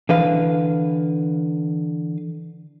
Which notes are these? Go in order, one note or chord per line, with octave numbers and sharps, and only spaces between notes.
D3 E3 B4 F5